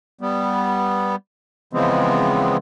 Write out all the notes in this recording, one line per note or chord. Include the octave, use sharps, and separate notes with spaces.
G3 B3
C#3 E3 F3 G#3 B3 C4